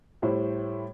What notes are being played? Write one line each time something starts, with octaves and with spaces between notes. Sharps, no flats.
A2 G3 E4 C5